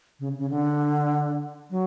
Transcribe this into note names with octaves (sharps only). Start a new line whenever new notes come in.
C#3
C#3
D3
F#3